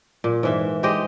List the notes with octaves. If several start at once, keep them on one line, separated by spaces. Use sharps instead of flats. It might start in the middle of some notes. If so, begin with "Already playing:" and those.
A#2
G#2 E3 E5
G#3 G4 C5 D#5